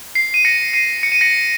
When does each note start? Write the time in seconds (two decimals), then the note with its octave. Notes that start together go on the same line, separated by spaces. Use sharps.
0.15 C7
0.34 D#7
0.45 A#6 C#7
0.73 C7 D#7
1.03 C#7
1.12 D#7
1.21 A#6 C#7